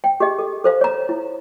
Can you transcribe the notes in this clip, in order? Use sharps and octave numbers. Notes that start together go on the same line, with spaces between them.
G5
G4 G#4 D#5
A4
A4 C5 F5
C#5 A#5
E4